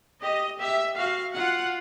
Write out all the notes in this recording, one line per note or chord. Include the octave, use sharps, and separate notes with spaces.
G4 D#5
G4 E5
F#4 F5
F4 F#5